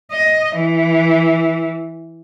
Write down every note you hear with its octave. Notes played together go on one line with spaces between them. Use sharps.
D#5
E3